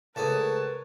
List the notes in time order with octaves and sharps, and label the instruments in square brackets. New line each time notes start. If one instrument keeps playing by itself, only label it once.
[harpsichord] C#2 A3 D#4 [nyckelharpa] A#4 C#5 [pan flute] B4 [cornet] A5